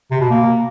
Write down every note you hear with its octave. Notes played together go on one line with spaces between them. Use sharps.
C3
B2
A#3